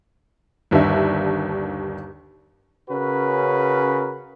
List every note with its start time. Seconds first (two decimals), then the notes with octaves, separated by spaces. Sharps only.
0.71 G1 D#2 D4 E5
2.90 C#3 C#4 F#4 A#4 B4